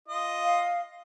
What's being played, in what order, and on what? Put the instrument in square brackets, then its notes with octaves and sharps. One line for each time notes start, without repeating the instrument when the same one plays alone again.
[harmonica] F4 D#5
[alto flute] F5